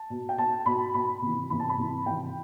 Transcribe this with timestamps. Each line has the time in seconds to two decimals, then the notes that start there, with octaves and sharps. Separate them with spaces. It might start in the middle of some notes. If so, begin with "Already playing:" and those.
Already playing: A5
0.10 B2
0.29 G5
0.38 B2 A5
0.66 B2 B5
0.94 B2 B5
1.22 C3 E3
1.50 C3 E3 B5
1.60 A5
1.69 B5
1.78 C3 E3
2.06 C3 E3 G5